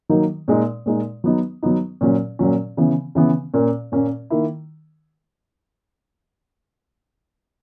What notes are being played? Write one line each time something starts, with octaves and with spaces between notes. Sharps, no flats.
D#3 F#3 A#3 D#4
A#2 G#3 D#4
A#2 G#3 D#4
F#3 B3 D#4
F#3 B3 D#4
A#2 F#3 C#4
A#2 F#3 C#4
C#3 E3 B3
C#3 E3 B3
A#2 A#3 C#4
A#2 A#3 C#4
D#3 A#3 E4